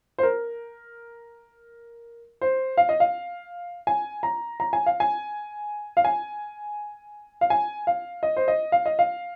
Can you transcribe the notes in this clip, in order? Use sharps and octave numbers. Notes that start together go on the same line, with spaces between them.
C5
A#4
C5
F5
D#5
F5
G#5
A#5
A#5
G#5
F5
G#5
F5
G#5
F5
G#5
F5
D#5
C5
D#5
F5
D#5
F5